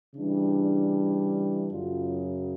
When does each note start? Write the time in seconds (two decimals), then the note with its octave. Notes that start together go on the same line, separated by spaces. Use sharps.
0.15 C#3 E3 G3 D4
1.71 F#2 C#3 F#3 F4